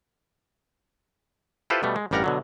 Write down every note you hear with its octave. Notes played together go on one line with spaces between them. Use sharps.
E4 F4 G4 A4 B4 C5
B2 G3 A3 B3
G#3
A1 G2 G3 A#4 F#5 A#5
B2 D3 F#3